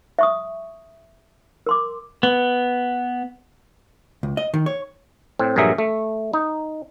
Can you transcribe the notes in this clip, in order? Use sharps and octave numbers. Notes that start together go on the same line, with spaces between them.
E5 C#6 D#6
A#4 C6 D6
B3
C#2
D#5
D#3
C#5
A2 C4
A#1 G2 F#3 G#4 A#4 E5
A3
D#4